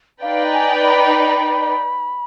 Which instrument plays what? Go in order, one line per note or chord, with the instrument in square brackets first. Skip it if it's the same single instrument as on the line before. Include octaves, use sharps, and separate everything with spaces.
[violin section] D#4 B4 D5 G5 [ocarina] F5
[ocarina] G#5
B5